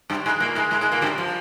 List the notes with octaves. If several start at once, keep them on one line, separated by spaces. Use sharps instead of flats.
G2 G3
G#2 G#3
A#2 A#3
G#2 G#3
G#2 G#3
G#2 G#3
A#2 A#3
G2 G3
F3